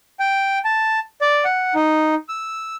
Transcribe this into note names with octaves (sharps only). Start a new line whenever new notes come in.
G5
A5
D5
F#5
D#4
E6